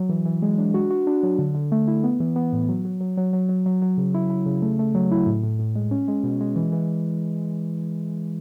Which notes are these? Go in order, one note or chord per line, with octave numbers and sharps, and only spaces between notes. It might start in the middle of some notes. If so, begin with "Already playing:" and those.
Already playing: F#3
E3
E3
G#3
D4
F#4
F#4
D4
F#3
D3
D3
A3
E4
B3
E3
B3
A2
F#3
F#3
F#3
F#3
F#3
F#3
F#3
F#3
C#3
E4
E4
C#3
A3
A3
F#3
E4
A2
A2
A2
G#3
C#4
G#3
B2
G#3
E3
E3